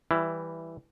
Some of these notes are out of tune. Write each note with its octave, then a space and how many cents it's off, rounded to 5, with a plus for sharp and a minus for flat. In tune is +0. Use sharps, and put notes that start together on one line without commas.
E3 +0 G3 +0 E4 +5